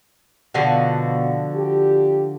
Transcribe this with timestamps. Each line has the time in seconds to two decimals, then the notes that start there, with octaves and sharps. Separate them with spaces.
0.54 B2 D3 F3 F#4
1.55 G4